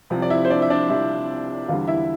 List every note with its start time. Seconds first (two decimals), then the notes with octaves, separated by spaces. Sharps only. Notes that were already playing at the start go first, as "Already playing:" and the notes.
0.10 C2 C3 F3
0.22 D5
0.30 E4 E5
0.45 C5
0.50 D4 D5
0.62 E5
0.70 D4 D5
0.89 C2 C3 F3 E4 E5
1.68 E2 D3 G3 F4 F5
1.88 E4 E5